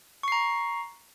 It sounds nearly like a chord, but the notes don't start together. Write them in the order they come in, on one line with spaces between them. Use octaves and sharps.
C#6 C7 A#5